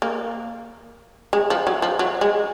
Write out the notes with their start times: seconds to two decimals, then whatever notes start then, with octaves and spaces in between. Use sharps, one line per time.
0.02 A#3
1.33 G#3
1.50 F3
1.67 F#3
1.82 F3
1.99 F#3
2.21 G#3